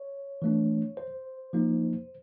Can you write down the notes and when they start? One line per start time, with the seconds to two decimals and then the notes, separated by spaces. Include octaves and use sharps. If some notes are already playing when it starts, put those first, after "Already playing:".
Already playing: C#5
0.42 E3 A3 D4
0.97 C5
1.53 F3 A#3 D#4